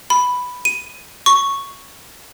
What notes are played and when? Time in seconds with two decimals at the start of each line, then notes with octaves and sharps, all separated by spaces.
0.10 B5
0.65 D#7
1.26 C#6